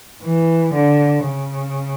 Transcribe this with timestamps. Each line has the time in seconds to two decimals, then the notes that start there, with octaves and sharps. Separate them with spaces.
0.22 E3
0.74 D3
1.25 C#3